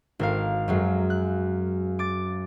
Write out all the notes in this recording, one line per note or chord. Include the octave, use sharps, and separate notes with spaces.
G#1 A#4 F5
F#2 F#3 G#3
F#6
D6 A6